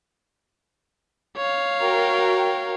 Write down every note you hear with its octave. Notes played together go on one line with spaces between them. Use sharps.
C#5 F5
F#4 A#4 G5